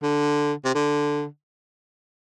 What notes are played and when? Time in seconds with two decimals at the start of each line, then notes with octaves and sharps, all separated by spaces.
0.03 D3
0.65 C3
0.75 D3